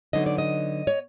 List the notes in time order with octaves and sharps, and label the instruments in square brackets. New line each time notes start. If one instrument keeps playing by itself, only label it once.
[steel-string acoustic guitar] D3 F#3 B3 D#4 D#5
D5
D#5
C#5